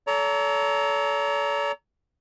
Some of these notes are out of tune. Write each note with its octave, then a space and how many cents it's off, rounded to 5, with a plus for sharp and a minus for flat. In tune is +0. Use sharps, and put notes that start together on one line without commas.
A4 -15 C#5 +45 A#5 +0